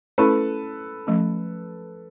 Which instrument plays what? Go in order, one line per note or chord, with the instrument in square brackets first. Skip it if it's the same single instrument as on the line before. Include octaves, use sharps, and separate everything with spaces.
[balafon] A3 C#4 E4 [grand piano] A4 B4
[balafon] F3 A3 C#4